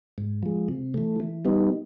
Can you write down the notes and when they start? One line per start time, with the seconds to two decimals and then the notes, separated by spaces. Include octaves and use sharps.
0.18 G#2
0.43 F3 G#3
0.68 C3
0.94 E3 A3
1.20 E3
1.45 G3 B3 D#4